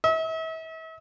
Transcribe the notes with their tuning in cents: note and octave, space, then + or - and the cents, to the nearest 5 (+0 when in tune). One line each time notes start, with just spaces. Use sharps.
E5 -40